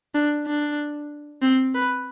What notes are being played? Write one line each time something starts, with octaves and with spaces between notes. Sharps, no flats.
D4
D4
C4
B4